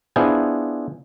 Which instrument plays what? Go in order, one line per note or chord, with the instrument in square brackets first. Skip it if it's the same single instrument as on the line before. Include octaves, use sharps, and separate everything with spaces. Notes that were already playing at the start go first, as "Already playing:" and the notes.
[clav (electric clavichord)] B3 D4 E4 F4 G#4 C5